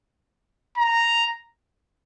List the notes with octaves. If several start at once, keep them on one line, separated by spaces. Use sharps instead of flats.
A#5